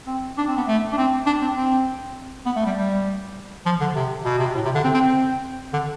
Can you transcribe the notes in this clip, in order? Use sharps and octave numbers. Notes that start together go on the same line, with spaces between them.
C4
D4
C4
B3
A3
D4
C4
D4
C4
C4
B3
A3
G3
G3
F3
D3
C3
B2
C3
B2
A2
C3
D3
C4
C4
C4
D3